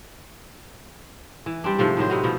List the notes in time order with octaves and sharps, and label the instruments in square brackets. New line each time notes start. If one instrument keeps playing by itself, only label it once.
[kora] E3
G3 C4 D4
G#2 C3 F3 A3
A2 D#3 F#3 C5
C3 B3 D#4 F#4
B2 F3 E4